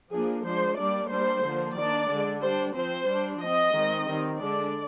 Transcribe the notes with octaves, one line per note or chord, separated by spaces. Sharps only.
F3 A#3 D4 G#4
F3 G#3 D4 C5
G3 A#3 D4 D5
G3 A#3 D4 C5
D3 F3 A#3
D#3 A#3 D4 D5
D3 G#3 D4
G3 D4 C5
F3 C4 C5
G3 D4
F3 C4 D#5
D#3 G#3 C4
D#3 G3 C4
D3 G#3 D4 D5